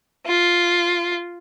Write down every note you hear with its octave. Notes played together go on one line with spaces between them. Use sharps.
F4